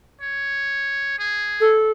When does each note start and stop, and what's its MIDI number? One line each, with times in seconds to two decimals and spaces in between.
0.21 1.17 73
1.19 1.73 68
1.60 1.91 69